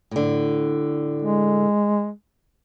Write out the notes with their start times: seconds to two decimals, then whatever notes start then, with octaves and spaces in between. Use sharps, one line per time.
0.11 A2 D3
1.22 G#3